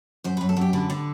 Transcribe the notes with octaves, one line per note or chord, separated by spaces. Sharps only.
F#2 C5
B4
F#2
A4
F#2 G4
D3 B4
D3